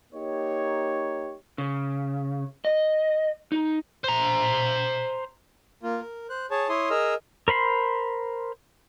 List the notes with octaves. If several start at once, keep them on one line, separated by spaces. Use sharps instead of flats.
A#3 D#4 G4 C#5
C#3
D#5
D#4
C5 A#5
A#3 F4
A#4
C5 F#6
G#4 C#5 A5
E4 C#5 C6 D#6
G#4 A#4 D#5 E6 F6
A#4 C5 B5 C6